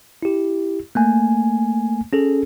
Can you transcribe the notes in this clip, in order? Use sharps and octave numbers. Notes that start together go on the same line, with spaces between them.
E4 G4
A3 A#3 G#5
C#4 G#4 A4